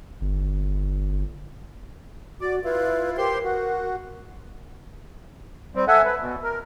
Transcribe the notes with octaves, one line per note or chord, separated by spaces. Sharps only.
G1
F#4 D5
E4 F4 B4
G4 A#4 C5 C6
F#4
G3 C4
A4 E5 F#5 G#5
B4
B2
A#4